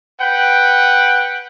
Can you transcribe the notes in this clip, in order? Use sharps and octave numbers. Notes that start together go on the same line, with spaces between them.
B4 F#5 G5